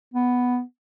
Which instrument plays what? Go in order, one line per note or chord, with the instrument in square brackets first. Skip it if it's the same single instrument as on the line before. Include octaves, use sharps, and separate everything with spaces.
[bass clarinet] B3